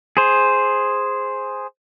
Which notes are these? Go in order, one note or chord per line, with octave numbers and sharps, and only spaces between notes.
G#4 C5